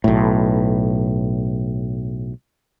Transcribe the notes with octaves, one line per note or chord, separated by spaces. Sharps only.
B1 A2